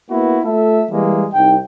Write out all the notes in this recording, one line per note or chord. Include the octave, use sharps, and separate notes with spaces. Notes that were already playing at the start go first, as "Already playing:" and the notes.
A#3 B3 E4 F#4
A3 F4 A4 E5
E3 G3 G#3 A#3
C2 D#4 G5